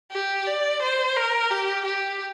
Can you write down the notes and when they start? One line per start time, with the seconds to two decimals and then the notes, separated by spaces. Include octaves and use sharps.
0.12 G4
0.47 D5
0.82 C5
1.17 A#4
1.50 G4
1.85 G4